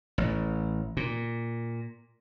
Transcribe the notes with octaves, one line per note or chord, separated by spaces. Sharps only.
A1
A#2